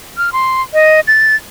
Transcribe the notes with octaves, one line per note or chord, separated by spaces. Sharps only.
F6
C6
D#5
A6